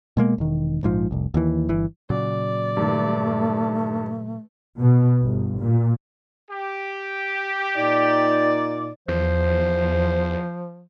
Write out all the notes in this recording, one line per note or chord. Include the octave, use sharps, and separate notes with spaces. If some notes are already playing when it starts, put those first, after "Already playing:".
B2 G#3 A#3
E1 D#3
A#1 G#2 F3
F1 C2
D#2 E3
G1 E3
A#2 C#3 F#3 D5
G2 D#3 A3
B2
G1
A#2
G4
A#2 D#4 D5
E2 F3 C5